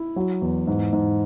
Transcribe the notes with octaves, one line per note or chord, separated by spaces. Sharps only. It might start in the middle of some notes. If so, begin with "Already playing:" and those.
Already playing: E4
F#3
E2
G#2
G#2